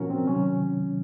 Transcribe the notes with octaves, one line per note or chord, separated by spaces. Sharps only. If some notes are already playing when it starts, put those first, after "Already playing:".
Already playing: A#2 F3 C#4 F#4 A#4
C4
C3 D#3 F#3 C#4